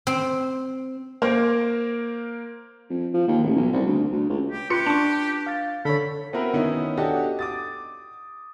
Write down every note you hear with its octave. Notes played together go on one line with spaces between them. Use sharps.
C4
A#3 A#4 C5
F2
F3
D#2
A1
B1
C2
D2
D2
C#2
G4
F4 G4 B4 C6 F#6 C#7
D4 A5 C#6
F5 A6
D3 A4 C#5 B5
B3 C4 E4 F#4 A#4 B4
D#3 B3 C#4 D#4 E4
D4 F#4 G4 A4 D#5
D6 D#6 A6